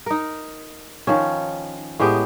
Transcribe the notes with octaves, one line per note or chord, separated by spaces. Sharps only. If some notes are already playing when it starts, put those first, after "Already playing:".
D#4 A#4
D#3 F3 C#4
A2 G#3 B3 G4